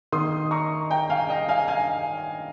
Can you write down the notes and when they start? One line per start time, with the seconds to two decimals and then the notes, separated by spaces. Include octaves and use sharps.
0.12 D#3 A#3 C6 D#6
0.51 A#5 C#6
0.91 G5 A#5
1.10 F5 G#5
1.29 D#5 G5
1.48 F5 G#5
1.68 F5 G#5